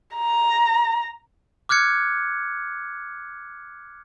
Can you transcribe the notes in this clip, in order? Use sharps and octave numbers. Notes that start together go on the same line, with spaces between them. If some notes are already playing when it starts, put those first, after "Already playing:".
A#5
D6 F6 F#6 G#6 C#7